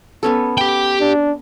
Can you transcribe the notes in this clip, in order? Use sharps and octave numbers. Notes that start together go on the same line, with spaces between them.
B3 C#4 A4
G4 G5
D4